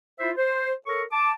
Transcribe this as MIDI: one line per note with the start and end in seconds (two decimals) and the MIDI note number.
0.19 0.31 64
0.19 0.31 65
0.19 0.31 72
0.19 0.31 76
0.37 0.72 72
0.87 1.02 69
0.87 1.02 70
0.87 1.02 73
0.87 1.02 85
1.12 1.31 81
1.12 1.31 86